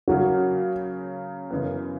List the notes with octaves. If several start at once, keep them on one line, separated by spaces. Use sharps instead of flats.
C#3 F#3 A#3 F#4
F#2 C#3 E3 B3